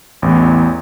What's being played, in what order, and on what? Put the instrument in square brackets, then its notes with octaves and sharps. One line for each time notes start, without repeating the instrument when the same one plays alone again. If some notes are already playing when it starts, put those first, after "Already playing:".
[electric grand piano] A1 E2